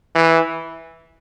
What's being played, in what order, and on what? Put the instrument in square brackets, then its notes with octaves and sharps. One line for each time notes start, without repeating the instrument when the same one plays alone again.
[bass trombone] E3